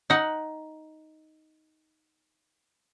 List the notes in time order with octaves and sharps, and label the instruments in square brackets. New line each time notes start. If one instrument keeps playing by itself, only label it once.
[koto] D#4 F#5